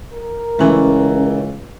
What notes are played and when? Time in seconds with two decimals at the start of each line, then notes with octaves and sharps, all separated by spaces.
0.13 A#4
0.59 C#2 E3 A3 C#4